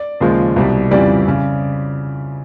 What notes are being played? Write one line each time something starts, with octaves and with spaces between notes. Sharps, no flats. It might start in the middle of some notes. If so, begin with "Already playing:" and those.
Already playing: D5
D#2 C#3 F3 G#3
C2 B2 G3
F2 C#3 E3 G3 C4 D5
C#3